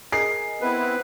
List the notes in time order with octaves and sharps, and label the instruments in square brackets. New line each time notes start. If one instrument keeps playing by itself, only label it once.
[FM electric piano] G#4 A#4 D#5 [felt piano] C7
[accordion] B3 C4 E4 [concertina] B4